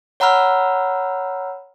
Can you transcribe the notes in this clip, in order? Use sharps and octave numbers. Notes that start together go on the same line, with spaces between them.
C#5 F#5 A#5 B5 E6 F6